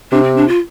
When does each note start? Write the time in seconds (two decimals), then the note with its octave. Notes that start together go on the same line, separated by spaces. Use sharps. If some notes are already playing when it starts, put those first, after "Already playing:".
0.12 C3 D4
0.23 C4
0.36 D4
0.48 F4